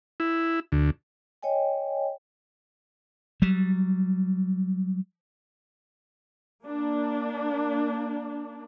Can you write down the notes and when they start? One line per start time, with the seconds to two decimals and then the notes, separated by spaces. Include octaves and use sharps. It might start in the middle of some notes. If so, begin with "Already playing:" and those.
0.20 E4
0.72 D2
1.43 C#5 D#5 G5 G#5
3.42 F#3 G3
6.64 A#3 D4